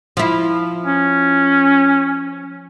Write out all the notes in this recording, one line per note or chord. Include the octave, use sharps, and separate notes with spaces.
F3 E4
C#4